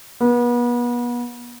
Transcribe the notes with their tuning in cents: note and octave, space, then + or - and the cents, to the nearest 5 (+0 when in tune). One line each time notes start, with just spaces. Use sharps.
B3 -35